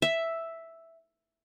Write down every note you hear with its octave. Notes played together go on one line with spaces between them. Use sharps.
E5